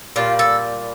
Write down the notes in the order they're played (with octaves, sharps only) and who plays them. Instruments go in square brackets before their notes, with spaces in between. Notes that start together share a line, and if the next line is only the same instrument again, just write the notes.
[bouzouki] A#2 G3 F4
A4